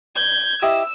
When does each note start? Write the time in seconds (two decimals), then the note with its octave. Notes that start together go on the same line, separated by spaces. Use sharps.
0.16 G6 G#6
0.62 E4 G4 D#5 E6